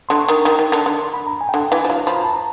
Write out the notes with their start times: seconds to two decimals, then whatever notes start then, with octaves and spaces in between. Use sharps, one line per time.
0.09 D3 C6
0.19 C#6
0.28 D#3
0.45 D#3
0.59 D#3
0.72 D3
0.86 D3
1.00 C6
1.14 B5
1.27 A#5
1.41 G#5
1.49 G5
1.54 D3 F#5
1.71 E3 F5
1.85 F3
1.89 F#3 F5
2.07 F3 B5
2.16 A#5
2.25 A5
2.33 A#5